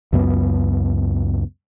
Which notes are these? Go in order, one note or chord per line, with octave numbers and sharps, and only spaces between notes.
C#2 F#2 B3